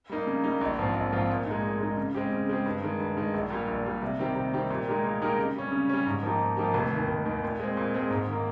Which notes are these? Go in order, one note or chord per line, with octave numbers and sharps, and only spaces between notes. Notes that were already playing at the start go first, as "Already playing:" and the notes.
G3 A#3 D#4
C#3
G3 A#3 D#4
A#1
G#2 F3 C4 F4
A#1
G#2 F3 C4 F4
A#2
G#3 D#4
A#2
G#3 D#4
C#3
G#3 C4 G4
C#3
G#3 C4 G4
G2
D#3 G#3
G2
D#3 G#3
A#1
A#2 G3
A#1
A#2 G3
C3
D#3 G3 C4 G4
C3
D#3 G3 C4 G4
A#2
G#3 D#4 G4 A#4
A#2
G#3 D#4 G4 A#4
C#3
G3 C#4
C#3
G3 C#4
G#2
F3 A#3 D#4 G4
G#2
F3 A#3 D#4 G4
F1
D#2 D#3
F1
D#2 D#3
A#2
G#3 C4
A#2
G#3 C4
G#2
D#3
A#3